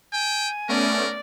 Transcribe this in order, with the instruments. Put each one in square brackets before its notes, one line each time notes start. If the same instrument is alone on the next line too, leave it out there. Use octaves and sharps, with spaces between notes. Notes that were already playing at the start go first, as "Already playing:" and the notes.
[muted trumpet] G5 [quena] G#5
[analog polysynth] A3 B3 C#4 [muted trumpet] A#4 [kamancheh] D5